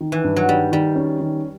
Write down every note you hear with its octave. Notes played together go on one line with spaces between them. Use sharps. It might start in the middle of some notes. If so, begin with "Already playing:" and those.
D#3
E3
G2
F#3
D#3 G3
D#3 G3
C#4
D#3